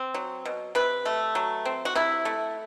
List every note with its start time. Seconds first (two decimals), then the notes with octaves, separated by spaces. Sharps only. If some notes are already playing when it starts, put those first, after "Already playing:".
Already playing: C4
0.14 F#3
0.45 B2
0.75 C3 B4
1.05 A3
1.35 F#3
1.65 C4
1.85 F#4
1.95 C3 E4
2.25 A3